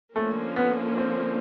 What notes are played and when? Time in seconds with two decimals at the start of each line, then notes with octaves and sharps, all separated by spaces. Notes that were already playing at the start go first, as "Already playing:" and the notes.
0.16 D3 F3 A3 A#3 C#4
0.56 B3
0.98 C4